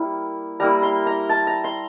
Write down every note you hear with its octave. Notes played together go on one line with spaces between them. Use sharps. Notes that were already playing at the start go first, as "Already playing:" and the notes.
Already playing: G3 A#3 E4
G3 A#3 E4 A#5
C6
A#5
A5
A#5
C6